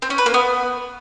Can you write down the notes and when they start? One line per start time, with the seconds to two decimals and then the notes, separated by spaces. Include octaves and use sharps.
0.02 C4
0.10 C#4
0.18 B4
0.26 A#3
0.34 B3